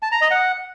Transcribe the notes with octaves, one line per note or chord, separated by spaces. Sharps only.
A5
A#5
D#5
F#5